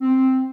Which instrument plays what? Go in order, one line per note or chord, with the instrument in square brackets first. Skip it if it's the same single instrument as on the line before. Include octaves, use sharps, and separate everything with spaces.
[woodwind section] C4